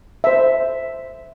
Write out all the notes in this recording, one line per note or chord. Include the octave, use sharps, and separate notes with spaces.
C5 E5